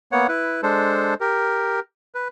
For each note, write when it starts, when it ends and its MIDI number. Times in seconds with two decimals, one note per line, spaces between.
0.12 0.27 58
0.12 0.27 59
0.12 0.27 73
0.12 0.27 78
0.28 0.61 64
0.28 0.61 71
0.63 1.14 56
0.63 1.14 62
0.63 1.14 69
0.63 1.14 72
1.20 1.80 67
1.20 1.80 70
2.15 2.28 71